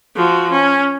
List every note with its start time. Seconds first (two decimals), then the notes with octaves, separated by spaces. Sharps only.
0.16 F3 F#4
0.51 C#4